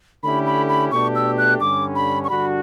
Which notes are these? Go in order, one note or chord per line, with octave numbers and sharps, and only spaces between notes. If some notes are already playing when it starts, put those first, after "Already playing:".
D3 A3 C#4 E4 G4 B5
B5
B5
B2 A3 D4 G4 C#6
E6
F#6
G2 D3 G3 C#4 D6
B5
C#6
G2 D3 G3 D4 F#4 B5